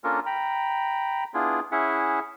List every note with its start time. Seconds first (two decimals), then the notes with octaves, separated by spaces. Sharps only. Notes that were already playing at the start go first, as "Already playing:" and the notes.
0.04 A#3 C#4 D4 F4 A4 A#4
0.26 G5 A#5 B5
1.34 B3 D4 E4 F4 G#4
1.72 C#4 E4 G#4 E5 F#5